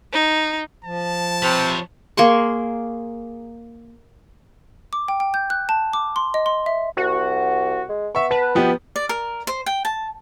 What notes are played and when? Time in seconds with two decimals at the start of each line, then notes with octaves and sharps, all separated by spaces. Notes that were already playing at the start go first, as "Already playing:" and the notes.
0.13 D#4
0.85 F3 A5
1.42 C3 B4 C#5
2.17 A#3 G#4 C6 C#6
4.93 D6
5.08 G5
5.20 G5
5.34 G6
5.50 F#6
5.69 A5
5.93 D6
6.16 C6
6.34 D#5
6.46 C6
6.66 E5
6.97 C2 F#4
7.89 G#3
8.15 B3 E5 C#6
8.31 B4 A5
8.55 B2 F3 B3 G4
8.96 D5
9.09 A#4
9.47 C5
9.66 G5
9.85 A5